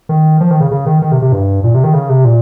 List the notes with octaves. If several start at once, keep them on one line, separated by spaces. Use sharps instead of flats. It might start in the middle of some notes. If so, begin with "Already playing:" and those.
D#3
F3
D#3
C#3
C#3
D#3
D#3
C3
C3
G2
A#2
C3
D#3
C#3
C3
A#2